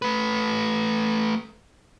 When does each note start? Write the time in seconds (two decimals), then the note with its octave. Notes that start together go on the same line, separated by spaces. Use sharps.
0.02 A3 B4